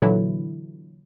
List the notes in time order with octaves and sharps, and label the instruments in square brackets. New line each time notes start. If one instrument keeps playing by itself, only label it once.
[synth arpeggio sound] A#2 D3 E3 F#3 E4